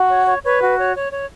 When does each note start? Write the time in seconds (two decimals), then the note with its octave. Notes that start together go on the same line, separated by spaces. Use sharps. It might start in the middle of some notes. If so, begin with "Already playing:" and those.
Already playing: F#4
0.09 C#5
0.27 C#5
0.44 B4 C#5
0.61 F#4
0.77 C#5
0.94 C#5
1.11 C#5